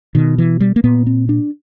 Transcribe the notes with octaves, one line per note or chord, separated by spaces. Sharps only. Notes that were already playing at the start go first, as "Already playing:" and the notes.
B2 D#3
E3
G3
A#3
A#2 B3
C4
D4